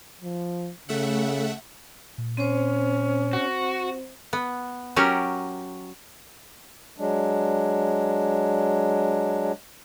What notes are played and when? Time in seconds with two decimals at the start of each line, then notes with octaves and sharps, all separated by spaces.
0.22 F3
0.89 C#3 A3 E5 F#5
2.18 A#2
2.37 C4 C#4 C5
3.33 F#4
4.33 B3
4.96 F#3 C#4 G4 A#4
6.98 F#3 G#3 D4